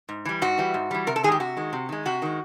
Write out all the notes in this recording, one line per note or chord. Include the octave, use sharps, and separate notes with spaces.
G#2
E3 G3
G#2 F#4
E3 G3
G#2
E3 G3
C3 A#4
A4
D#3 G#3 G4 G#4
C3 F#4
D#3 G#3
C3
D#3 G#3
C3 F#4
D#3 G#3